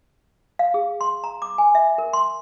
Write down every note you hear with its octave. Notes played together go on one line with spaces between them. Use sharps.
F5
G#4
C6
A#5
D6
G#5
E5
A#4
C6